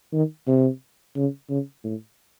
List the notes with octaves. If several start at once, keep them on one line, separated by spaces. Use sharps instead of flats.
D#3
C3
C#3
C#3
A2